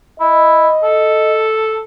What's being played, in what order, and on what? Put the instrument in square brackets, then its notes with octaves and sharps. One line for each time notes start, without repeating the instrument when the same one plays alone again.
[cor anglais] E4 [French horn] D#5
[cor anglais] A4